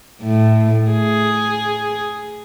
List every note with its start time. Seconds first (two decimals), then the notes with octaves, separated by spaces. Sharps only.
0.22 A2
0.91 G#4